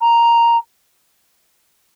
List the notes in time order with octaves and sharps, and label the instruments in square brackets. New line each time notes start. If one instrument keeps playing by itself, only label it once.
[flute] A#5